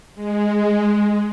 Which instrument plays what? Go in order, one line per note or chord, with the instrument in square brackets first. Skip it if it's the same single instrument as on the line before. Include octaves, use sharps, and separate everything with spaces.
[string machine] G#3